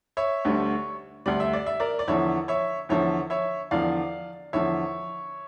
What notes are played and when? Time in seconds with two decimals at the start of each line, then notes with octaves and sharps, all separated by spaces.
0.17 C#5 E5
0.45 D2 D3 G3
1.26 D2 D3 G3 D5
1.40 E5
1.53 D5
1.66 E5
1.80 A#4 D5
1.99 D5
2.08 E2 D3 F3 C#5 E5
2.48 C#5 E5
2.89 E2 D3 F3 C#5 E5
3.30 C#5 E5
3.71 E2 D3 F3 D5 F5
4.53 E2 D3 F3 C#5 E5